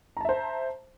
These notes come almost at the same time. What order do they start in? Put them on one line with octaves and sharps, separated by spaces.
A#5 A5 E5 C5